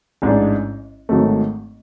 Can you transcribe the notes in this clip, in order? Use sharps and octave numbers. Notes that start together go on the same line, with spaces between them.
A1 G#2 G#3 D4
G#1 G#2 F#3 A3